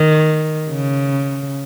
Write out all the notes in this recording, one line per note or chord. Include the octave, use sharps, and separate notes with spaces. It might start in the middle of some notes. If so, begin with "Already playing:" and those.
Already playing: D#3
C#3